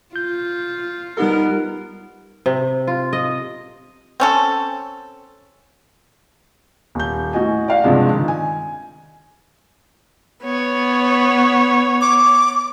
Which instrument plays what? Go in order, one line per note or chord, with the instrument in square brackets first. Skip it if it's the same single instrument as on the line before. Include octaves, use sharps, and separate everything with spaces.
[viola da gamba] F4 [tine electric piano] G6
[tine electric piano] G3 D#4 G4 [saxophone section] B3 A#4
[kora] C3
F4
D#5
[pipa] C4 C#4 A4
[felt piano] D#1 G6
A2 F#4 D#5 G#5
D5 F5 F#5
G2 C3 F3 G#3 D4
D#3
G#5
[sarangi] B3 [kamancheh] C#5
[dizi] D6